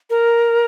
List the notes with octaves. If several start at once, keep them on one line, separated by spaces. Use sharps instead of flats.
A#4